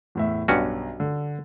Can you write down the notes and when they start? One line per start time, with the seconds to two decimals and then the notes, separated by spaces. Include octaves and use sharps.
0.15 E2 A2 E5
0.48 B1 G2 C#4 F#4
1.00 D3